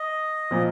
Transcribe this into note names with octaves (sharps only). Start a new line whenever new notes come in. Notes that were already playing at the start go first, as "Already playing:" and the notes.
Already playing: D#5
A#2 F3